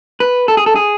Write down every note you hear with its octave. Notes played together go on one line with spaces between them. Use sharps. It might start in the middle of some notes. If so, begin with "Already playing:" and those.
B4
A4
G#4
A4
G#4